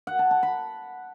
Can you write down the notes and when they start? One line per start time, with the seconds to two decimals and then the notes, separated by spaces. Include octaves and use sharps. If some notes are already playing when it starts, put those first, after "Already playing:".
0.07 F#5
0.19 A5
0.31 A5
0.43 B5